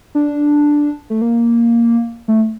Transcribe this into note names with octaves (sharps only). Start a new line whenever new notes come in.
D4
A3
A#3
A3